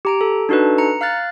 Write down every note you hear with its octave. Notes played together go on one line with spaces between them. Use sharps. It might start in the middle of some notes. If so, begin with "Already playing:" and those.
G4 A#5 D7
A4
D4 D#4 F#4 A4 B4
A#5 C#7
F5 F6 F#6 A6